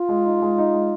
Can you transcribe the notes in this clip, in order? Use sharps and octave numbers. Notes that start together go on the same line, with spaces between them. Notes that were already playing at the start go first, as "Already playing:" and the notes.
Already playing: F4
G#3
D#4
G#3
D#4
G#3